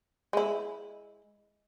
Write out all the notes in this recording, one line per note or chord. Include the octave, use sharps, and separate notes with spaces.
G#3 E4